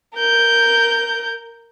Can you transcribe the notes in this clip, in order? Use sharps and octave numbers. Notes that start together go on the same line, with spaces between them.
A#4 G6